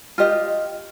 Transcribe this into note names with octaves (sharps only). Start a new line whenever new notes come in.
F4 G4 D#5